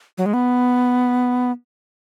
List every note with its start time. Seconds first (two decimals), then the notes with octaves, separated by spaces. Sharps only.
0.18 F#3
0.26 G#3
0.34 B3